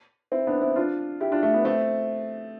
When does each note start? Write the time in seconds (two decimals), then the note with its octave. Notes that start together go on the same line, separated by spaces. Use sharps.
0.32 C4 E4
0.47 B3 D4
0.61 C4 E4
0.76 D4 F4
1.20 E4 G4
1.32 D4 F4
1.43 A3
1.54 B3
1.64 A3 C4